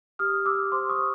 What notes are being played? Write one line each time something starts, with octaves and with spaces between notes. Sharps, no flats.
G4 D#6 F6
G4 D6 E6
C5 C6 D6
C#6 D#6
C5